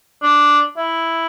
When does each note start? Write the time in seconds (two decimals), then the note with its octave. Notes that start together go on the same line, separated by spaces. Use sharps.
0.23 D4
0.77 E4